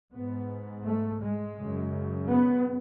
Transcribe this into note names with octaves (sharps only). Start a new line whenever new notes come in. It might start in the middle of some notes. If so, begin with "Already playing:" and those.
G#2 B3
A3
G#3
F#2 C#3
B3